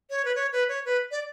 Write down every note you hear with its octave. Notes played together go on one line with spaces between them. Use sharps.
C#5
B4
C#5
B4
C#5
B4
D5